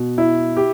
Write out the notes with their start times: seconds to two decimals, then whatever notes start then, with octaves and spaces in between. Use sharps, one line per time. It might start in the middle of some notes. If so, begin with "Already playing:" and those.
Already playing: B2
0.18 E4
0.57 G4